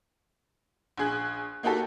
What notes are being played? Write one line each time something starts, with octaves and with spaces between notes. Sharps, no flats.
A#1 G#4 F#6
A#3 D#4 F#4 G4 A4